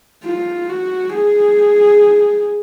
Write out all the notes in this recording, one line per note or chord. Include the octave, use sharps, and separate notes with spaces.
F4
F#4
G#4